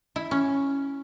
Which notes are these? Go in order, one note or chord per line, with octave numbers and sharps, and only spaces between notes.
E4
C#4